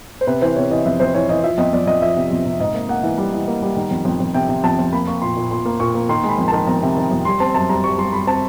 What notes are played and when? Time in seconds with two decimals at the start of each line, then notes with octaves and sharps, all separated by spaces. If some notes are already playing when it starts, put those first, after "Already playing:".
0.21 C5
0.27 C3 B4
0.41 E3 C5
0.56 C3 C#5
0.70 E3 D#5
0.85 F2 E5
1.00 F2 C5
1.14 E3 C#5
1.29 E3 D#5
1.43 F3 E5
1.58 F2 D#5
1.73 F2 D5
1.87 F2 D#5
2.02 F3 E5
2.16 C3
2.31 F2
2.45 C3
2.60 G#2 D#5
2.74 A#3
2.89 A#3 F#5
3.03 E3
3.18 G3
3.33 E3
3.48 A#3
3.62 G3
3.76 D#3
3.91 F2
4.05 F2
4.20 F2
4.34 C3 G5
4.49 C3
4.64 F2 A5
4.79 F2
4.93 A#3 B5
5.07 A#3 C#6
5.22 A#2 C6
5.37 A#2
5.51 A#2 C6
5.65 A#3
5.80 A#2 C#6
5.95 A#3
6.09 D#3 C6
6.24 G#3 B5
6.39 F2
6.48 D#3 A5
6.68 F2 A#5
6.83 C3
6.97 D#3
7.11 F2
7.25 G3 C6
7.40 C4 A5
7.54 F#2 A5
7.69 G3 A#5
7.84 G3 C#6
7.98 G3 C6
8.13 G3 B5
8.27 C4 A5